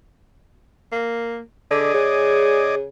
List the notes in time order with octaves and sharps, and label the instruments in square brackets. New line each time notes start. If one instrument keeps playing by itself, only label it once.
[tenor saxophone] A#3
[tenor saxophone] D3 [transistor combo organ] G#4 D5 D#5
[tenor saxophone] C#3